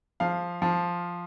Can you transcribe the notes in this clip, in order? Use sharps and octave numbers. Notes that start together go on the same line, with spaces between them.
F3 F5
F3